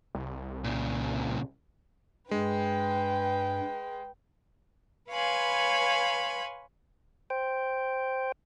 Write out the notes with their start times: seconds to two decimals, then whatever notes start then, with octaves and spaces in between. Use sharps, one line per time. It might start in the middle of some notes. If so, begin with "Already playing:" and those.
0.15 C2
0.64 A#2 C#3
2.31 G2 G#3 B4 G5
5.10 B4 C#5 F5 G#5 B5 C6
7.30 C5 G5